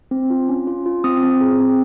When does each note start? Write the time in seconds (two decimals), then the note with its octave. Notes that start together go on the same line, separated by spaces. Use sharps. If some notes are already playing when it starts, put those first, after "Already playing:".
0.11 C4
0.30 F4
0.49 C#4
0.67 F4
0.86 F4
1.04 C4 D#6
1.23 C4
1.41 G#4
1.60 C4